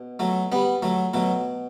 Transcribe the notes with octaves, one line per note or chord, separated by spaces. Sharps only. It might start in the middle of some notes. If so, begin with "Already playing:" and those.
Already playing: B2
F#3 A3
G3 B3
F#3 A3
B2 F#3 A3